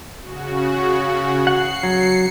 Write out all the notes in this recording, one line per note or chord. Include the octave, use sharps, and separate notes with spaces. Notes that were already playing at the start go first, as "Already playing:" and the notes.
C#3 F#4
F#5 C7 C#7
F#3